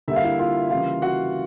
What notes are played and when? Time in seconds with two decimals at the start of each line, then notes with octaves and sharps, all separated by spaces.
0.08 D3 G3 A#3 E5
0.16 F5
0.24 E4 E5
0.39 F4 F5
0.70 C#3 E3 G3 A#3 F4 F5
1.02 F#4 F#5